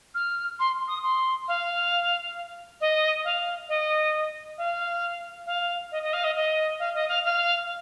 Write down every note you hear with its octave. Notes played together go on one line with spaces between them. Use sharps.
F6
C6
D#6
C6
F5
D#5
F5
D#5
F5
F5
D#5
D#5
F5
D#5
D#5
F5
D#5
F5
F5